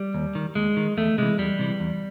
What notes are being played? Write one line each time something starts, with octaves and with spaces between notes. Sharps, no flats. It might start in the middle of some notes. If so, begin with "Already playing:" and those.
Already playing: G3
D#2
D#3
D#2 G#3
D#3
E2 A3
C3 E3 G#3
E2 G3
C3 E3
E2